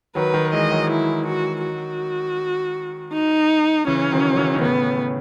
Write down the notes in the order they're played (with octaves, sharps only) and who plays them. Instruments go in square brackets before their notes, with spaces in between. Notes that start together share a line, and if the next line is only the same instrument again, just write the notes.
[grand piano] D#3 F#3 [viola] B4
[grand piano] D#3 F#3
[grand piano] E3 G#3 [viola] D#5
[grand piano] D#3 F#3
[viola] E4
F#4
F#4
D#4
[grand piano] C#3 E3 [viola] C#4
[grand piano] D#3 F#3
F#3
C#3 E3
D#3
[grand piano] A2 C#3 [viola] B3